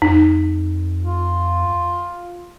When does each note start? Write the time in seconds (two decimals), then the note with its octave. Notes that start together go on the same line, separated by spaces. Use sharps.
0.02 F2 D#4
1.03 F4